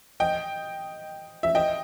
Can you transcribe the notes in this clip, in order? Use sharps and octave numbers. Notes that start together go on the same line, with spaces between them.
D#5 G5
E5
D#5 G5